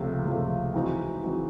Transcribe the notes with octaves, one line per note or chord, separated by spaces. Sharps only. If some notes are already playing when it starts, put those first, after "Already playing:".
Already playing: C#2 C3 F3 A3
C#2 C3 F3 A3
E3 G#3 C4 D#4 F#4
E3 G#3 C4 D#4 F#4